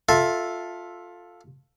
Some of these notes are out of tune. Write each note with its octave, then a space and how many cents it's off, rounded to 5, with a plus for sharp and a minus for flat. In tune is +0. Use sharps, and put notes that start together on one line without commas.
F4 +15 A4 +0 E5 +0